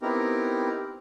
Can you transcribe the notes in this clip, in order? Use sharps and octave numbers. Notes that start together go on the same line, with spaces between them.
B3 C4 D#4 E4 G4 A#4